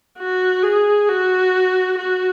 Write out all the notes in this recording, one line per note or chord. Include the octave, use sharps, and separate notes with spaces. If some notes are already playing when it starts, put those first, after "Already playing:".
F#4
G#4
F#4
F#4